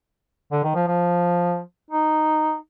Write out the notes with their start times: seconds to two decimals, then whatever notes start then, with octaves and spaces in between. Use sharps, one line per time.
0.52 D3
0.63 D#3
0.75 F3
0.87 F3
1.91 D#4